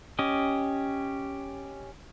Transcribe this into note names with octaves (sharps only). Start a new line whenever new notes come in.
C#4 G4 D#5